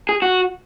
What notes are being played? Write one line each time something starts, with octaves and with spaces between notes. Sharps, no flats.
G#4
F#4